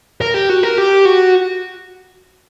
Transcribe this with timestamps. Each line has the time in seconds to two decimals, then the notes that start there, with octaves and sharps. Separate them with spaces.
0.21 A#4
0.34 G4
0.49 F#4
0.63 A#4
0.78 G4
1.06 F#4